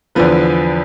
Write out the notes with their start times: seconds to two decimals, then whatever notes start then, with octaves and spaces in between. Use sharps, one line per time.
0.15 E2 D3 F3 B4